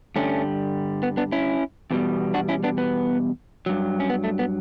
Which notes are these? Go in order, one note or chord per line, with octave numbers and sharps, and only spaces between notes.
G2 D3 G3 A3 C#4
B3
B3 D4
C#4 E4
E2 B2 G3
D4 F#4
C#4 E4
B3 D4
B3
G2 F#3
C#4
B3
A3
B3